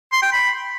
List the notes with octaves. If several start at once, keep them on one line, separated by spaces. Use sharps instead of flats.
C6
G5
B5